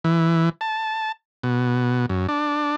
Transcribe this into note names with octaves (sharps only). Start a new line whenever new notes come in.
E3
A5
B2
F#2
D4